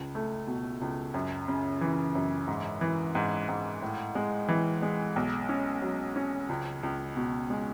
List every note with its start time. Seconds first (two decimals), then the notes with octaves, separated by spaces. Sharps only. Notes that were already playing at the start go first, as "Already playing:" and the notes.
Already playing: C#2
0.15 A3
0.47 B2
0.81 C#2
1.14 F#2
1.48 C#3
1.81 E3
2.15 F#2
2.48 G#2
2.81 E3
3.15 G#2
3.49 G#2
3.82 A2
4.15 G#3
4.48 E3
4.82 G#3
5.16 B1
5.49 C#4
5.82 F#3
6.16 C#4
6.49 C#2
6.83 C#2
7.16 B2
7.50 G#3